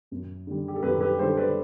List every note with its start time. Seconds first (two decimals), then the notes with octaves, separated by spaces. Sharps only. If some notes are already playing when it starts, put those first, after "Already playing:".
0.11 F#2
0.47 D3 G3
0.68 G4
0.76 A4
0.83 F#2 G4 B4
1.01 G4 B4
1.19 D3 G3 A4 C5
1.37 B4 D5